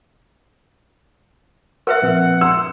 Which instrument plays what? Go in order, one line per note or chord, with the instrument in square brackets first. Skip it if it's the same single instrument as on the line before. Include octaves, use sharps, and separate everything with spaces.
[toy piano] A#4 B4 E5 [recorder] F#5
[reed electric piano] A#2 F3 C4
[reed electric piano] C6 [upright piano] E6